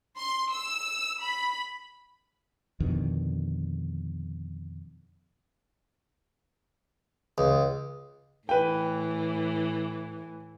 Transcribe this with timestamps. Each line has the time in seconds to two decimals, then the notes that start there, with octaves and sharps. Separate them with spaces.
0.18 C6
0.51 E6
1.21 B5
2.80 F2 B2 D3 D#3
7.38 C#2
8.49 A2 E3 B4 G5